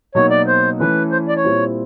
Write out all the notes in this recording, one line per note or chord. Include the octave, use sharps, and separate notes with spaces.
B2 F#3 A#3 D#4 F#4 C#5
D5
C5
E3 A3 C#4 E4 B4
C5
D5
C#5
A#2 G3 C4 E4